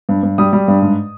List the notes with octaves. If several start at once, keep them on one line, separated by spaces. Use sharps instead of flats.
G2
G2
G3 D#6
G3
G2
G#2